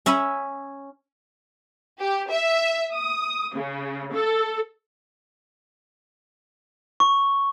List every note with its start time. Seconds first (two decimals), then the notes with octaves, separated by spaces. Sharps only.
0.06 C#4 E5 G#5 B5
2.00 G4
2.29 E5
2.93 D#6
3.54 C#3
4.13 A4
7.00 C#6